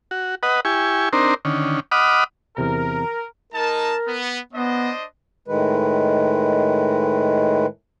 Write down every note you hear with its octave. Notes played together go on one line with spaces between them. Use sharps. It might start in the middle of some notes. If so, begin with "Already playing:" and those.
F#4
B4 D#5 F#5
E4 G4 G#5 C#6
C4 D4 D#4 A#4 C5
D3 D#3 C#4
D#5 F#5 B5 D6 D#6 F6
E2 C3 A#4 A#5
G#3 D#4 A#4 A5
B3
B3 D4 C5 D#5
A2 D#3 G#3 B4